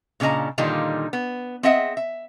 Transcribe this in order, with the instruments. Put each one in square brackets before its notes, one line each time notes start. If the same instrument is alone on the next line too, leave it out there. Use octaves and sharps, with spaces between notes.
[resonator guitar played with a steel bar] A#2 C#3 D4 D#5 A#5
A#2 D3 D#3 G3 D#4 F4
B3
C4 G#4 D#5 E5 F#5
E5